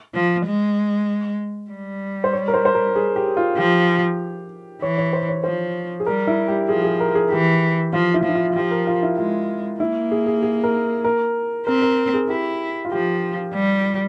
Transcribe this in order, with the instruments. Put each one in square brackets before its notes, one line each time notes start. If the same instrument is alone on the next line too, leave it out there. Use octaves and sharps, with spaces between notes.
[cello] F3
G#3
G3
[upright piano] C5
C#5
A#4
C5
C5
A#4
G#4
G4
F4
[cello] F3 [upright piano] G4
[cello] E3 [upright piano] C#5
[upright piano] C#5
C5
C#5
[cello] F3 [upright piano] C5
[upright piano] G#4
[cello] G3 [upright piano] A#4
[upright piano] E4
G4
[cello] F3 [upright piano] G#4
[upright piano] G#4
A#4
G#4
[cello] E3 [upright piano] G4
[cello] F3 [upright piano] F4
[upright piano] E4
[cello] F3 [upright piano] E4
[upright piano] F4
F4
[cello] F3 [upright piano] G4
[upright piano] A#4
F4
E4
[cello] G#3 [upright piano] F4
[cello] A#3 [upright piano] E4
[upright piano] G#4
G#4
G#4
A#4
A#4
[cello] C4 [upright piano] A#4
[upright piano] A#4
G#4
[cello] E4 [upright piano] G4
[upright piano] F4
[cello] F3 [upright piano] G4
[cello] G3